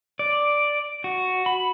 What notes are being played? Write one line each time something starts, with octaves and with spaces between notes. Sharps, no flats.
D5
F#4
B5